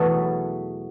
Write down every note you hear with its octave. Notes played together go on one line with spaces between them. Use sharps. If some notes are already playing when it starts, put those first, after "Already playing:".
Already playing: E2 B2 F#3 A3 B3